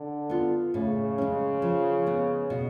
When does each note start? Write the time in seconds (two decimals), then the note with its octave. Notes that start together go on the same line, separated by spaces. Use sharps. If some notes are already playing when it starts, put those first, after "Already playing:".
Already playing: D3
0.30 B3 F4
0.74 A2 C#3
1.18 G#3 C#4
1.62 F3
2.06 G#3 B3
2.50 B2